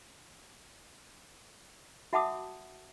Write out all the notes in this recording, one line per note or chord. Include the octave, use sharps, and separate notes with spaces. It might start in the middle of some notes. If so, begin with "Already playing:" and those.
F#4 E5 F#5 A5 D6 D#6